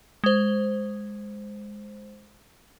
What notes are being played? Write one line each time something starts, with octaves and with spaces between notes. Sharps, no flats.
G#3 C5